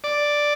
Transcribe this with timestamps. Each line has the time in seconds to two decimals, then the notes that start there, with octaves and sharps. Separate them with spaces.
0.04 D5